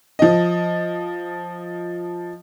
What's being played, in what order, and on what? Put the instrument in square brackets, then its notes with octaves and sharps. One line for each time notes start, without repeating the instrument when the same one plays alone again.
[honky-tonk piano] F3 D#5